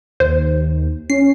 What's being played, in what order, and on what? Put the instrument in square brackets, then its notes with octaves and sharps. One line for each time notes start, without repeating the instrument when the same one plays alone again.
[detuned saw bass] D#2 [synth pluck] C5
[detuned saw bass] C#4 [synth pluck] C7